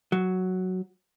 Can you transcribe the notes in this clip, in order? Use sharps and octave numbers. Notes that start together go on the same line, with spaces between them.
F#3